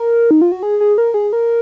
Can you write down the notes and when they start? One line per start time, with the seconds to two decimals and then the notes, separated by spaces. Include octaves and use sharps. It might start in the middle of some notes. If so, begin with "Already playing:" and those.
Already playing: A#4
0.31 D#4
0.42 F4
0.52 F#4
0.63 G#4
0.80 G#4
0.98 A#4
1.14 G#4
1.33 A#4